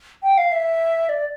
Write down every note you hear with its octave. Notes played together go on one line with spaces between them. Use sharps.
G5
F5
E5
D5